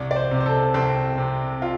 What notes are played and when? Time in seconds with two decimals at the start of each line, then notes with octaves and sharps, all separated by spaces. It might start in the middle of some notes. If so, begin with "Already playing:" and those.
Already playing: C2 D5
0.11 D5
0.16 C5
0.31 C3
0.40 C5
0.46 A4
0.74 C2 C4
1.18 C3
1.62 F4